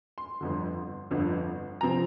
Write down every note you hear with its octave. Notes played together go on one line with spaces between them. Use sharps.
C6
G1 F2 D3
G1 F2 D3
C3 F3 C4 A#5